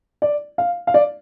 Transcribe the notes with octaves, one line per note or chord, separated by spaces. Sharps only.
D5
F5
F5
D5